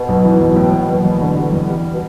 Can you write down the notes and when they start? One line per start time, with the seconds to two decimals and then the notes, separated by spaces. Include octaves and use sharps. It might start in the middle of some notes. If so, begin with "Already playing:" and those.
Already playing: B2
0.08 B1
0.25 E3
0.40 B1
0.56 A2
0.72 E2
0.89 F#1
1.05 E2
1.21 D3
1.37 G3
1.52 E2
1.69 G3
1.93 B2